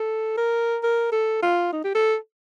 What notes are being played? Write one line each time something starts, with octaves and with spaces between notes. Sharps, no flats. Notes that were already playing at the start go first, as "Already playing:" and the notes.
Already playing: A4
A#4
A#4
A4
F4
D#4
G4
A4